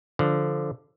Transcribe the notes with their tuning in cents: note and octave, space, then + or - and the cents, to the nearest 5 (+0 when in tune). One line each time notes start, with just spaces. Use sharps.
D3 +0 F3 +0